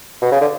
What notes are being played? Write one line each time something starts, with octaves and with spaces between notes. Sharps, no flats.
B2
C#3
D3